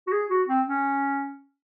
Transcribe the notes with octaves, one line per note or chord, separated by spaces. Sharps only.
F#4
G#4
F#4
C4
C#4